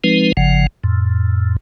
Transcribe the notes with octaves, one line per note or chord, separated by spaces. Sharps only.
F3 G#3 C4 D#4 B4
G1 C#3 F3 F#5
F2 A2